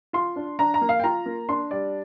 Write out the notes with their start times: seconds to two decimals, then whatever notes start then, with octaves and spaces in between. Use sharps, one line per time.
0.13 F4 C6
0.36 D4
0.59 D4 A#5
0.74 A#5
0.81 A#3
0.89 F5
1.00 G5
1.04 F4 A#5
1.26 A#3
1.48 D4 C6
1.71 G3 D5